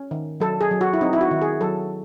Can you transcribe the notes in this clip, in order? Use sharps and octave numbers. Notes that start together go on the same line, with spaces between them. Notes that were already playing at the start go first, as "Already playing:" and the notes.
Already playing: C#4
D#3
F#3 A4
G#4
F#3
F#4
E4
C4 D#4
E4
F#4
D#3
G#4
F#3 A4